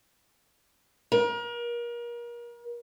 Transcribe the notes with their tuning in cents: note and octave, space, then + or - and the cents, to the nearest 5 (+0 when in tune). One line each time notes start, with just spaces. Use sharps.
A#4 +35